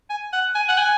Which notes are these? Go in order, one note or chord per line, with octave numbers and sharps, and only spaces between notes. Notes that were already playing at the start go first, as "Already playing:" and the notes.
G#5
F#5
G#5
F#5
G#5